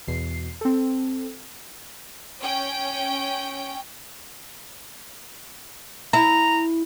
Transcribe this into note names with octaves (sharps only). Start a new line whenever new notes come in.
E2 B2 C7
C4 A4
C#4 G5
E4 A#5